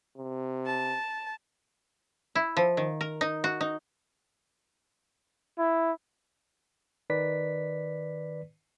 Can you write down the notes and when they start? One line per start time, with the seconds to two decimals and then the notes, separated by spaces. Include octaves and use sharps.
0.17 C3
0.66 A5
2.35 E4
2.57 F3
2.77 D#3
3.01 A#4
3.21 D#4
3.44 F#4
3.61 D#4
5.58 E4
7.10 D#3 B4 D5 B6